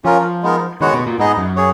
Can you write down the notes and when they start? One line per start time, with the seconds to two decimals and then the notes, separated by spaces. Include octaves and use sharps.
0.04 F3 C#4 F4 A#4
0.43 G#3 B3 D#4 A#4
0.81 D#3 G#3 B3 F#4 C#5 F#5
0.93 B2
1.07 A#2
1.18 G#2 B3 D#4 G#4 D#5
1.38 F#2
1.56 G#4 C#5